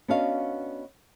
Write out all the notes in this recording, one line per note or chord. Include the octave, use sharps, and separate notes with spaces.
B3 C#4 D4 F#4 D#5 F5